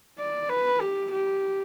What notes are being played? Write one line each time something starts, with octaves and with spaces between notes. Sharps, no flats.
D5
B4
G4
G4